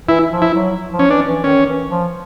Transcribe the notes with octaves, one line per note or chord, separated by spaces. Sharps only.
E3 E4
F3
E4
F#3
F3
C#4
E3 D4
E3
D#3 C#4
E3
F3